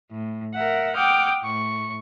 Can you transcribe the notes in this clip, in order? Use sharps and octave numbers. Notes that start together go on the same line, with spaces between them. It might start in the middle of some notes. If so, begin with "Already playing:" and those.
A2
A#4 E5 F#5
F#5 G5 D6 D#6 F6 G6
A2 C#6